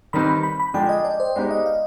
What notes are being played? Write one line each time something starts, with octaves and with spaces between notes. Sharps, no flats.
D#3 G3 C4 D#4 B4 B5
B5
B5
B5
D3 F3 G#3 D4 G#4 G5
D#5
D5
C5
G#3 B3 D#4 G4 D5
D#5
F5